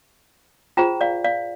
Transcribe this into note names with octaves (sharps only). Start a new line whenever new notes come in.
F4 G#4 C5 G5 A#5
D5 F5
D5 F5